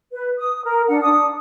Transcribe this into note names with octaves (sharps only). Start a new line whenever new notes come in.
B4
D#6
A#4
D4 F#5
D4 D#6